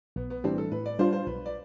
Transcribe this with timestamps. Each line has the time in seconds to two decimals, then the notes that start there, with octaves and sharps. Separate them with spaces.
0.16 B1 B3
0.30 B3
0.44 A2 E3 G3 C4 D4
0.58 A4
0.72 A2 B4
0.86 D5
0.99 G3 D4 F4 C5
1.13 C5
1.27 B1 B4
1.46 D5